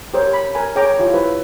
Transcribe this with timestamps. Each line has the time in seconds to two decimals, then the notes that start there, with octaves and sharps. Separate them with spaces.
0.14 G4 A#4 C5 C#5
0.33 B5
0.54 A#4 G#5 B5
0.75 G#4 C#5 G5 A#5 D6
0.99 E4 F4 G4 C#5
1.14 E4 B4 C5